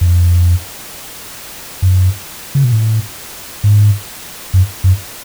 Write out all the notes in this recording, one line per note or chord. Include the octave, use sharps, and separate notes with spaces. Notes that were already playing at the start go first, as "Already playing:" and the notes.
F2
F#2
C#3
B2
A2
G#2
F#2
F#2